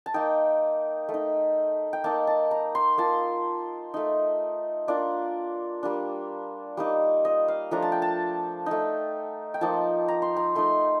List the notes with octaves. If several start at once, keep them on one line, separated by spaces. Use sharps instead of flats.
A5
A#3 D#4 G5
A3
D#4
G5
A#3 D#4 A5
A5
A#5
C6
A#3 F4 A5
A3 D#4
A#3 D4 F4 D5
G3 A#3 D4
G3 A#3 D#4
D#5
F5
F3 A3 D4 A#5
A5
G5
A5
A3 D#4
G5
F3 A#3 D#4 A5
A#5
C6
A#5
A3 D#4 C6